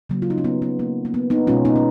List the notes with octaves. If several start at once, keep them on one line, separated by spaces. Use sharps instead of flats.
C#3 F#3 A#3
F4
D#4
C#4
B3
B3
A#3
A#3
B3
B3 D#4
B2 G#3 C#4 F4
B3 D#4
C#4